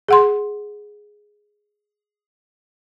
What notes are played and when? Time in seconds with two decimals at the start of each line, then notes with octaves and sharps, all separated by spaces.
0.08 G#4 F#5 C6